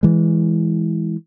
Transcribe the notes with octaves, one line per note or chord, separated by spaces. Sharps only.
E3 G#3